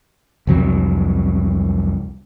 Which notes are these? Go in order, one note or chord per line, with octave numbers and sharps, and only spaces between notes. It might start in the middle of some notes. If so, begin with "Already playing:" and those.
C2 F2 F#3